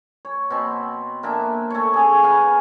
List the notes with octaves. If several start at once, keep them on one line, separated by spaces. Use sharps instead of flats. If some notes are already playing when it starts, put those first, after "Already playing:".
C#5
B2 C4
A#3 D4 E5
A3 C#5
C#3 G#4
B3 F5 G#5